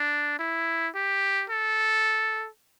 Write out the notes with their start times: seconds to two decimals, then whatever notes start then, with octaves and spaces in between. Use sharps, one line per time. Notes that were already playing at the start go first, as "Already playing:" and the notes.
Already playing: D4
0.39 E4
0.95 G4
1.50 A4